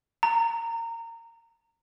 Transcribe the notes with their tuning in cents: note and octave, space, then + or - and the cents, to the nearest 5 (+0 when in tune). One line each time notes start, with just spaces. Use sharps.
A#5 -20